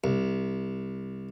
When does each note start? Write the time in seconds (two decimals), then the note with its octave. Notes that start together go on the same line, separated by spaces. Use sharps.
0.04 C2